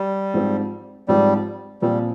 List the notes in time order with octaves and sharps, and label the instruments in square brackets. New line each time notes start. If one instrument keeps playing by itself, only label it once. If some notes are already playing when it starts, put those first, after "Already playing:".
Already playing: [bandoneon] G3
[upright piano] G#2 F3 C4
[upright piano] G#2 F3 C4 [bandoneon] G3
[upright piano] A#2 F3 C4 [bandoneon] G3